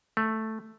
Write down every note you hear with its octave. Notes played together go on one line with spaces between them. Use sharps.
A3